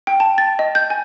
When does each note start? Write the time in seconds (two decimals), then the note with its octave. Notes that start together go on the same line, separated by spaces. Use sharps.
0.07 G5
0.20 A5
0.38 A6
0.59 D#5
0.75 G6
0.90 G#5